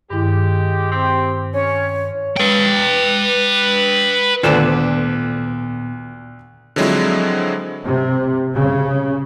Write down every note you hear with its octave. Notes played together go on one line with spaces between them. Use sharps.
G2 D#3 G#3 E4 G4
C4 G4
C#4 C#5
B4 G5
D2 A#2 D#3 B3 D4 F4 A4 C5
D3 F3 F#3 G#3 C4 E4
C3
C#3